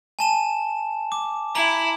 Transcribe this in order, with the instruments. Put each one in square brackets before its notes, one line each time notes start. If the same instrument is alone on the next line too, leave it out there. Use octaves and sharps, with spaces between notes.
[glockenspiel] G#5 A5 E7
D6
[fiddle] E4 [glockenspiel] A#5 F#7